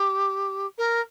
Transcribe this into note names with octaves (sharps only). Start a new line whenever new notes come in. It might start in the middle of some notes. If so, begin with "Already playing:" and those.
Already playing: G4
A#4